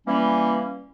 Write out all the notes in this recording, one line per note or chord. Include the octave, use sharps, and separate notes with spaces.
E3 G3 A#3 C#4